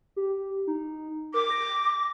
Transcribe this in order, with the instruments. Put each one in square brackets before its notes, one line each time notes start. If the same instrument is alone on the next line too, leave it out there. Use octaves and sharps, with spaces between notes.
[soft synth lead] G4
D#4
[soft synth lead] A#4 [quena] D6
[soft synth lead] A#6